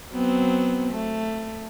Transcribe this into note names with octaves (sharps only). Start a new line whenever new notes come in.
F#3 B3 C4
A3